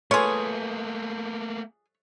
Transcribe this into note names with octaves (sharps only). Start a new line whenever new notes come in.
A3 A#3 F4 G#4 A4 B4 C#5 C6